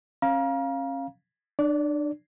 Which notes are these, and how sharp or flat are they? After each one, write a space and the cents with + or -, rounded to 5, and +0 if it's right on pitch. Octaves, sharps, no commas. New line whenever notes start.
C#4 -35 F5 +0 A#5 +35
D4 +30 D5 -30